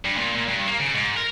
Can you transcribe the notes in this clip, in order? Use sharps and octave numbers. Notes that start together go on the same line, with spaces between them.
G2
A#2
A#2
G2
A#3
C#3
G#2
A#4